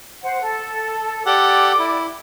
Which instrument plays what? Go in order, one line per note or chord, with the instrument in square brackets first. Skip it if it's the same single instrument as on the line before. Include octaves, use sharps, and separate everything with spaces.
[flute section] C5 F#5
A4
[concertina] G4 A4 F#5 [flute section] D5 D6
[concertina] E4